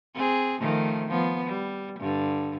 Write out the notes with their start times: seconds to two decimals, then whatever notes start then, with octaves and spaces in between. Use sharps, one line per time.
0.15 C4 G#4
0.60 D#3 F3 A3
1.08 F3 B3
1.47 G3
2.00 G2 D3